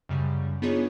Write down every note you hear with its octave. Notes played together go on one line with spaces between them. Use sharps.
F#2 C#3 G3
B3 D4 D#4 F4 G#4 C#5